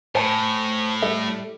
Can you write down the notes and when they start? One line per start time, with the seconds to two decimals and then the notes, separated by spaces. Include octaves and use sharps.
0.15 A2 C5 G#5 A5
1.02 G3 A4 E5